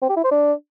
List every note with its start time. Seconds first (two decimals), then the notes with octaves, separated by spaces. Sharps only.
0.02 C4
0.09 G4
0.17 E4
0.24 C5
0.31 D4